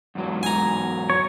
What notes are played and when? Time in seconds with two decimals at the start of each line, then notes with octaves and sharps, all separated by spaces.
0.15 E2 G#2 F#3
0.43 G#5 A#5
1.10 C#5